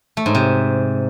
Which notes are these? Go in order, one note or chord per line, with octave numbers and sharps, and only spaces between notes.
A3
G#2
C3